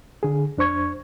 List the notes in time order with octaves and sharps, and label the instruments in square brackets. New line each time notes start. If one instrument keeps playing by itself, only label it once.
[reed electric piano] D3 G#4
F2 D4 C5 C#6 G#6